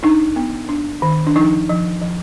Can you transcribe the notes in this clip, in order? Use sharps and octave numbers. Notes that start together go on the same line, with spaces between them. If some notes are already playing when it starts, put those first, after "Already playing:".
D4 D#4
B3
D4
D#3
D4
F3 D#4
F3
F3